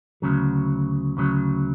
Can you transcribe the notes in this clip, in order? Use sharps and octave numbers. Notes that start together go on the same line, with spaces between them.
D2 C#3 F#3
D2 C#3 F#3